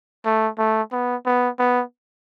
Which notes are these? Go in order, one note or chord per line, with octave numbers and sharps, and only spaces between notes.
A3
A3
B3
B3
B3